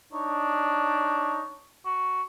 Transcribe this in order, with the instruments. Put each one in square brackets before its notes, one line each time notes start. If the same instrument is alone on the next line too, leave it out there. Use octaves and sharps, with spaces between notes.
[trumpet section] D4 D#4 [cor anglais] C#5
[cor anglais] F#4